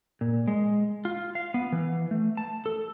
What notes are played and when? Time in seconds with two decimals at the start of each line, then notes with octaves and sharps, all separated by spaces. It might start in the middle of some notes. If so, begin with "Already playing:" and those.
0.21 A#2
0.48 G#3
1.05 F4
1.35 F5
1.54 B3
1.72 E3
2.11 A3
2.37 A5
2.66 A4